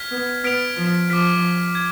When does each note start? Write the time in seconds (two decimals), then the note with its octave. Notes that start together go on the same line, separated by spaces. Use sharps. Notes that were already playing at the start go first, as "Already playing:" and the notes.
Already playing: F6 G#6 B6
0.11 B3
0.44 B3 F6 B6 D7 F7
0.77 F3
1.09 F3 D6 F6 B6
1.75 G#6